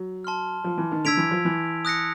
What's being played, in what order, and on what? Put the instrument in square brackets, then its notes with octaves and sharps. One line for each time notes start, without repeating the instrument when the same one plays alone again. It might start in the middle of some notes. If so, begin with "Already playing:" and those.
Already playing: [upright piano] F#3
[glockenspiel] A5 C6 F6
[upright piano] F3
E3
D#3
[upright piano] D3 [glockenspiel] E6 G#6 B6 D7 F7
[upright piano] E3
F3
E3
[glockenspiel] D#6 F#6 A#6 C#7